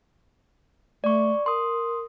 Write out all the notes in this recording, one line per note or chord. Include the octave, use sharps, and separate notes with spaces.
A3 D5 C#6
A#4 C6 D#6